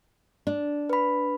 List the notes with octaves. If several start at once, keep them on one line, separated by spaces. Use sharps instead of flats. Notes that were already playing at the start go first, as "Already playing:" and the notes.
D4
B4 B5